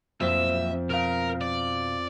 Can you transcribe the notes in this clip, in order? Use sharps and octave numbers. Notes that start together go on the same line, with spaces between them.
B1 F2 A#2 C4 E5
B2 A#4 F5
D5